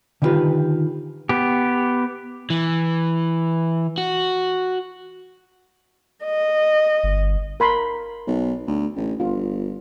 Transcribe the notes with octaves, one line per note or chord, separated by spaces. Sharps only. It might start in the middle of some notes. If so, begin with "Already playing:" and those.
D3 D#3 E4 F4 G4 B4
B3 G4
E3
F#4
D#5
G1
A#4 B5 C6
B1
D2
A1
G1 F4